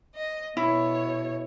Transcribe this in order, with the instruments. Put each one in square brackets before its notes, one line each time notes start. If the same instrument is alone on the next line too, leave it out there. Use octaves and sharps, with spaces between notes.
[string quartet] D#5
[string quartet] B2 C#5 [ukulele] E4